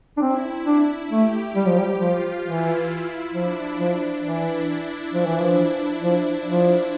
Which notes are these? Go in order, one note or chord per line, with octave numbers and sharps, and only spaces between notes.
D4
C4 E4
D4
A3 G4
G3
F3
G3
F3 F4
E3 E4
F3 D4
F3
E3 E4
F3
E3
F3
F3
F3